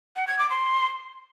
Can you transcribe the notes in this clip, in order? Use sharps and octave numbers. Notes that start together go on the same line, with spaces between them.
F#5
G#6
D6
C6